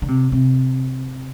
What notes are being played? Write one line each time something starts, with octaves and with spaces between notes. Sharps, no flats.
D3
C3
C3